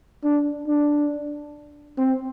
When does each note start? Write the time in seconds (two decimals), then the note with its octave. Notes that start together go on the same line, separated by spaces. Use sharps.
0.24 D4
0.67 D4
1.98 C4